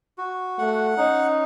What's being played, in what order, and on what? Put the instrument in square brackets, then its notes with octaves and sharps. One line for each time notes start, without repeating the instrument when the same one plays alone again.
[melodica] F#4
[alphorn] A3 [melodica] F#5
[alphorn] C#4 [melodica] D#4